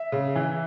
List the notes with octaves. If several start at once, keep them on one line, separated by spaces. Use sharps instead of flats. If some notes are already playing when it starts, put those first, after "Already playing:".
Already playing: E5
C#3
E3